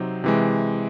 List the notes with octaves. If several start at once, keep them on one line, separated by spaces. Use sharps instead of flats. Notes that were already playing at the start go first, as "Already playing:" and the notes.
Already playing: C3 F#3 C4 D#4
C3 E3 G#3